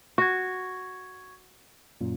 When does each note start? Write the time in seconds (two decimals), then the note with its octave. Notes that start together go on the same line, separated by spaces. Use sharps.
0.18 F#4 C#6 G#6
2.01 F#2 A#2